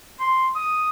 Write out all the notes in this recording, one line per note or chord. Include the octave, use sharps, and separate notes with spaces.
C6
D#6